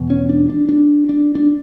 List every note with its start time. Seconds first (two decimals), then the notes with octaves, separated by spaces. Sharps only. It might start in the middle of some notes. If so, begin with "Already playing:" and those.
Already playing: E2 B2
0.10 C#4
0.29 D4
0.50 D4
0.69 D4
1.09 D4
1.35 D4